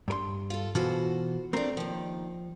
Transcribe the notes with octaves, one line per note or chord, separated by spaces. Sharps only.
G2 A#4 C6
F4 A4
B2 E3 F4 F#4 A4 C5
F3 A3 C4 D4 A#4
D#2 D#3 F3